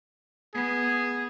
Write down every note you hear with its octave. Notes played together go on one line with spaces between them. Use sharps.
B3 G#4